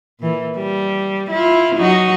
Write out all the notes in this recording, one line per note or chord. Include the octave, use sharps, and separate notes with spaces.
A#2 E3
G3
E4 F4
F#3 D#4 F#4